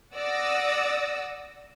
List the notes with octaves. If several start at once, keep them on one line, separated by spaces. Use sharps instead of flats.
D5 F#5 D#6 E6 A#6